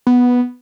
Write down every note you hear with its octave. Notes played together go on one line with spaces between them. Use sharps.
B3